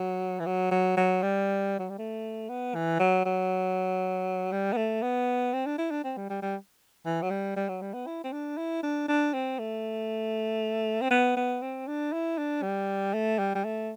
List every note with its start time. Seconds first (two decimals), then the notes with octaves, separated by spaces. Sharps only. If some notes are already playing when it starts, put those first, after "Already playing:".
Already playing: F#3
0.39 E3
0.46 F#3
0.71 F#3
0.97 F#3
1.22 G3
1.79 F#3
1.89 G3
1.98 A3
2.49 B3
2.75 E3
2.99 F#3
3.25 F#3
4.52 G3
4.73 B3
4.77 A3
5.02 B3
5.53 C4
5.66 D4
5.78 E4
5.91 D4
6.04 C4
6.17 G3
6.30 G3
6.42 G3
7.06 E3
7.22 F#3
7.30 G3
7.56 G3
7.69 F#3
7.81 G3
7.94 B3
8.06 E4
8.24 C4
8.32 D4
8.58 E4
8.83 D4
9.08 D4
9.33 C4
9.59 A3
11.01 C4
11.11 B3
11.36 B3
11.62 C4
11.87 D4
12.13 E4
12.38 D4
12.63 G3
13.14 A3
13.39 G3
13.55 G3
13.65 A3